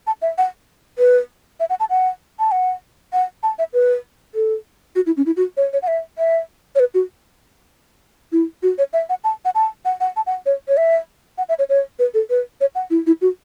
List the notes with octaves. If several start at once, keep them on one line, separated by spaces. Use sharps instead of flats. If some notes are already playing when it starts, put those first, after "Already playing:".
A5
E5
F#5
B4
E5
F#5
A5
F#5
A5
F#5
F#5
A5
E5
B4
A4
F#4
E4
C#4
E4
F#4
C#5
C#5
F#5
E5
E5
C#5
B4
F#4
E4
F#4
C#5
E5
F#5
A5
F#5
A5
F#5
F#5
A5
F#5
C#5
C#5
E5
F#5
E5
C#5
C#5
B4
A4
B4
C#5
F#5
E4
E4
F#4